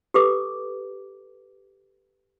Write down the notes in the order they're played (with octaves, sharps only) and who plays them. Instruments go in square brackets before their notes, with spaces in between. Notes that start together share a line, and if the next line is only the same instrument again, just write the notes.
[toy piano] G4 A4 B4 D6